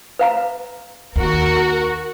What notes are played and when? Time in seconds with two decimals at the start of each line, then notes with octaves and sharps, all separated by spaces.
0.19 B4 F5 A#5
1.16 D#2 F#4 A#4